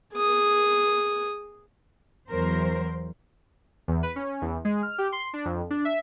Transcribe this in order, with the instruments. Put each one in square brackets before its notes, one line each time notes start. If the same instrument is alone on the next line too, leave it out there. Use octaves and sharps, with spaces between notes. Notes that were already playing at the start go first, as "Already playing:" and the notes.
[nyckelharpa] G#4 D#6
[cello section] E2 F#3 A#4 C5
[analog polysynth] E2
B4
C#4
E2
G#3
F6
G4
C6
D4
F2
D4
E5